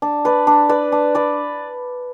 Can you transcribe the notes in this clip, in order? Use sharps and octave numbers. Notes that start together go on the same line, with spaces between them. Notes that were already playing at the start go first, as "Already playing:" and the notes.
D4
B4 D5
D4
B4 D5
D4
B4 D5